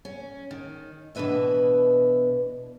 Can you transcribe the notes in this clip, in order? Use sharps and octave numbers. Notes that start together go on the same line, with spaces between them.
C#4
D#3
B2 E3 D4 B4 D#5 E5